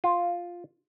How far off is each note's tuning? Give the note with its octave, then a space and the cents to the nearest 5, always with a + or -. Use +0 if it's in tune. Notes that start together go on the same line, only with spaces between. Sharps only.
F4 +5